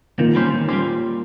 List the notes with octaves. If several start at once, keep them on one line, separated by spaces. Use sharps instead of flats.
A#2 D#3
G3 C#4 G4 C5
D#3
G3 C#4 G4 C5